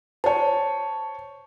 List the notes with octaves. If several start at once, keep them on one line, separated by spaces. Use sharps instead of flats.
C5 C#5 A5